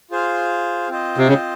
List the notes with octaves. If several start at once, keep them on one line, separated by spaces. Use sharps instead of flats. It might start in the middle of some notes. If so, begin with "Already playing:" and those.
F4 G#4 C5 F5
C4 F4 C5 D#5
C3
C#3